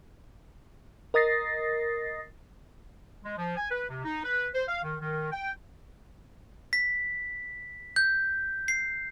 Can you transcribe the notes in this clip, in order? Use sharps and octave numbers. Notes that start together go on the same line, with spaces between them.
A#4 D#5 D#6 A6 A#6 C7
G#3
F3
G#5
B4
C3
D#4
B4
C5
F5
D#3
D#3
G5
B6
G6
C7